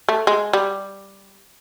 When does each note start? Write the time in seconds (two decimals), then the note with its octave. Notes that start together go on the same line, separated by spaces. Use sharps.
0.09 A3
0.27 G#3
0.53 G3